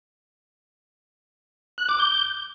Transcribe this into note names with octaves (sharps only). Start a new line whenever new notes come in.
F#6
D6
G6